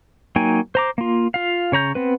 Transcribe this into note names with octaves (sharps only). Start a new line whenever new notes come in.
F#3 A#3 D#4 G5 G#5
C5 A#5 D6
A#3 F4
F4 F5
C#3 C#5 A#5 G6
B3 C4 B4